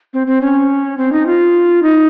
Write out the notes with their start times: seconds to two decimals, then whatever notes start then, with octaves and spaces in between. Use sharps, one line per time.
0.14 C4
0.27 C4
0.41 C#4
0.98 C4
1.12 D#4
1.27 F4
1.83 D#4